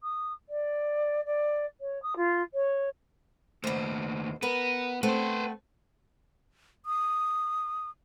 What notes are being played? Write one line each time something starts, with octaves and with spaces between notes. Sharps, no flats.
D#6
D5
D5
C#5
D#6
F4
C#5
D#2 B2 A3 C5
B3 A#4 B4
A3 B3 C4 B4 C5
D#6